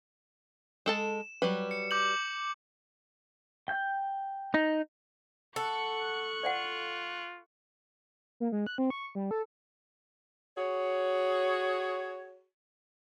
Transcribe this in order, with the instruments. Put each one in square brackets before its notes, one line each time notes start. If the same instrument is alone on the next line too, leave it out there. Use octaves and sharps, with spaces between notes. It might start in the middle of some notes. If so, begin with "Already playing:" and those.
[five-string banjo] G#3 A4 A5 [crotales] E7
[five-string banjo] F#3 G3 B4
[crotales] C#7
D6 G6 F#7
[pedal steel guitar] G5 G6
[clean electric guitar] D#4
[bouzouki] A4 [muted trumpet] F#5 [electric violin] C#6 F#6
[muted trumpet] F4 [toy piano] D5 F5 F#5
[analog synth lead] A#3
G#3
F#6
C4
C#6
G3
A4
[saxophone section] F#4 G#4 C#5